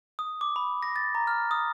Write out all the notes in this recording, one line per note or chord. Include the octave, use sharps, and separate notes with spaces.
D#6
D6
B5
A#6
A6
A#5
F6
D#6